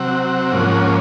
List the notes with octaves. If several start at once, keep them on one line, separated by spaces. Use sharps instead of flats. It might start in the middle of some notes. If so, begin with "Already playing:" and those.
Already playing: C3 F#3 C4 F#5
G#2 F3 A#3 C#4 F#5